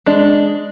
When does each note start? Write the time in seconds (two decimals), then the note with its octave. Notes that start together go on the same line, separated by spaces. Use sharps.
0.06 G#3 D4